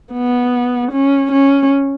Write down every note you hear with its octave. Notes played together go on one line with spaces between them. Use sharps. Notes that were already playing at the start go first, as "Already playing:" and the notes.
B3
C#4
C#4